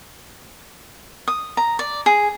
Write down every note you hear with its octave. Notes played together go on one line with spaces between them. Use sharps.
D#6
A#5
D5
G#4